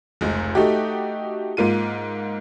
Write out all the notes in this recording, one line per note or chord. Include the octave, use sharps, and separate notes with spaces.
F1 C#2
A3 D#4 F#4 G4
G#2 A#3 F4 D#7